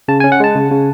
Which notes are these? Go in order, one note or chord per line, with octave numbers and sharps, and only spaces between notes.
C#3 A5
G#5
C#4
F#5
G#3 A5
C#3
C#3